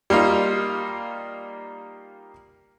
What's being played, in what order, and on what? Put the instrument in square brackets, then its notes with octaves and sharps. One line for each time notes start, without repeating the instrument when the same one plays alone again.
[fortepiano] G3 A#3 D#4 F4